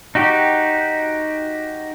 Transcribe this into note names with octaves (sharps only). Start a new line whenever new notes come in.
D#4 F#4 G4